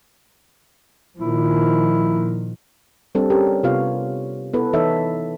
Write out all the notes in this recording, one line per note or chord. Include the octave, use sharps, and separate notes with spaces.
A#2 D#3 F3 E4
G3 C4 D4 A4
C#4 G4 A#4
C3 B3 F4 C#5 F5
B3 E4 A4 B4
E3 D#4 A4 C#5 E5